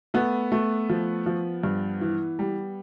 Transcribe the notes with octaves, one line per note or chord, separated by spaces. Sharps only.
A3 B3
A3
F3
F3
G2
E3
G3